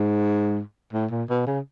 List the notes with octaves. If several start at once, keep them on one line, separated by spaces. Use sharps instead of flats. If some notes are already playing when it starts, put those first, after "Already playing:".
Already playing: G#2
A2
A#2
B2
C#3